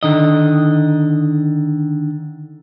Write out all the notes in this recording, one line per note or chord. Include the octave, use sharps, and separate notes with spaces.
D3 D#3 D#5